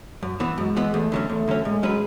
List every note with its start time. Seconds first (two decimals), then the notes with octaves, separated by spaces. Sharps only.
0.23 F#2
0.40 E3 B3
0.58 F#2 G#3
0.77 E3 B3
0.94 E2 A3
1.12 D3 F#3 C#4
1.29 E2 A3
1.48 D3 F#3 C#4
1.64 A2 G#3
1.83 F#3 C#4 G#4 B4